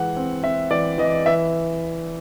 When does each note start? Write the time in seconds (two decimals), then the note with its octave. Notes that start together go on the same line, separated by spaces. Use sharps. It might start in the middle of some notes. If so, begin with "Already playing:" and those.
Already playing: E3 G#3 F#5
0.16 C4
0.43 C4 E5
0.71 E3 D5
0.98 E3 D#5
1.26 E3 E5